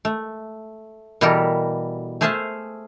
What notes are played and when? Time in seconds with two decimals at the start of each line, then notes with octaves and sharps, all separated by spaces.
0.05 A3
1.21 B2 E3 G3 G4 A4 A#4
2.21 A3 G#4 C5 E5 F5 A5